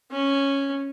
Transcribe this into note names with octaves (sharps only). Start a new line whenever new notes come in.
C#4